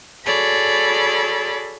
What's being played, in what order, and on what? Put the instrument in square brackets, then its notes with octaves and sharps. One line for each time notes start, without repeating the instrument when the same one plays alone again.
[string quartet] F#4 G#4 A4 C#5 D5 B5